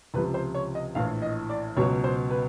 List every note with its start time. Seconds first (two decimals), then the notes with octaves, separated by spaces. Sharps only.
0.14 C#2 C3 F3 B4
0.34 C5
0.55 C#5
0.75 D#5
0.95 A#1 A2 E3 F5
1.22 D#5
1.49 D5
1.77 C#2 B2 F#3 C#5
2.04 C5
2.31 B4